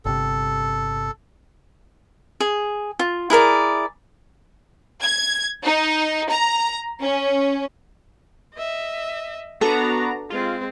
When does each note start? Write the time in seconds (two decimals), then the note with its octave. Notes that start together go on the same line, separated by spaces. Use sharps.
0.05 G1 C3 A4
2.40 G#4
2.99 F4
3.30 E4 G#4 A#4 D5
5.03 G#6
5.66 D#4
6.31 A#5
7.02 C#4
8.54 D#5 E5
9.61 B3 D4 F#4 A4 A#5
10.30 G#3 C4 F4